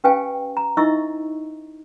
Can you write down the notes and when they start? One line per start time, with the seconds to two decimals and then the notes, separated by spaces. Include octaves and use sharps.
0.04 C#4 G4 B4 F5 G5 G#5
0.57 A#5
0.77 D#4 E4 D#5 E5 C#6 E6